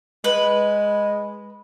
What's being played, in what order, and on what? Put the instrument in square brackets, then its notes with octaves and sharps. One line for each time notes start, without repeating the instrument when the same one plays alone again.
[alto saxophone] G#3 [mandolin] B4